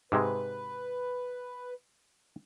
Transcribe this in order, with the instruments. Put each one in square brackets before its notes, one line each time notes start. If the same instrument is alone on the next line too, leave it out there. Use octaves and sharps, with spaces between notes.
[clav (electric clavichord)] G#2 C3 G#3 [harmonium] B4